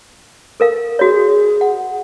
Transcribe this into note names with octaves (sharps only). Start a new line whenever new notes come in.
A4 A#4 F5
F#4 G#4 C#5
F#5